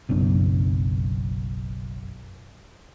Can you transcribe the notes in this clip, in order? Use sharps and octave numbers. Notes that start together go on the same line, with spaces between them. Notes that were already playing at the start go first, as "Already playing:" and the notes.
F#1 B1 F#2 D4